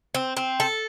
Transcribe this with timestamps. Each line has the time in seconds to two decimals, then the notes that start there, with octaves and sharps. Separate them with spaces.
0.14 C4
0.37 C4
0.60 A4